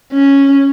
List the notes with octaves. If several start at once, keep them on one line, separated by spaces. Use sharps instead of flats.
C#4